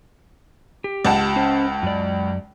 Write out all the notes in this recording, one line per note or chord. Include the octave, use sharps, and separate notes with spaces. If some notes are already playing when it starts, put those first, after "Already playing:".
G4
C#2 F#5 A5
C#4 C5
F#2 D5